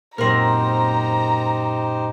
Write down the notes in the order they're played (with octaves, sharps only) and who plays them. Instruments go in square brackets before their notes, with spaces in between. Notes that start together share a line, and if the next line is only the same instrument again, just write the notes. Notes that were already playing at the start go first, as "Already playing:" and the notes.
[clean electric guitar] F#2 A#2 [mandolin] C4 A#4 [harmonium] D#4 G4 C5 [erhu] A#5